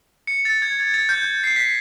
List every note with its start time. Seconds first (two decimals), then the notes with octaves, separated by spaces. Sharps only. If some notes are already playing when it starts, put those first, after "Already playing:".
0.27 C#7
0.45 A6
0.62 G#6
0.80 G#6
0.94 A6
1.09 G6
1.44 C7
1.56 B6